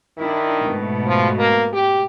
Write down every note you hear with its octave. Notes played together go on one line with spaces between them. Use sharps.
D#3 D4 E4
G#2 B2 A3
F3
A#3
G4